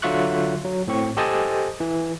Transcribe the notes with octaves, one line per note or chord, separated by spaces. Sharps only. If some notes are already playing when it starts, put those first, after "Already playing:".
D3 F#3 F4 E5 C#6 F#6
F#3
A2 C4 C#6
G4 A4 C5 D#5 G#5 A5
E3